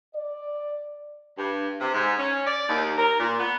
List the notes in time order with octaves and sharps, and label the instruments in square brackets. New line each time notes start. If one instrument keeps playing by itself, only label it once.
[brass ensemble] D5
[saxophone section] G2
C3
G#2
C#4
D5
D#2
A#4
A#2
B3